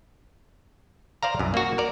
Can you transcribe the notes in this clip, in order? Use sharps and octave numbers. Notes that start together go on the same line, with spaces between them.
C5 D5 F5 A#5
C2 F#2
A#3 F#4
A#4 D5